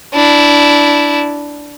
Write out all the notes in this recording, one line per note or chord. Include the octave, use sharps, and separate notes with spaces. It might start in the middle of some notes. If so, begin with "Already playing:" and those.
D4 E4